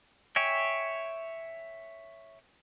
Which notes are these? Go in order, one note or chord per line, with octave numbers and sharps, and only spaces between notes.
C#5 E5 G5 G#5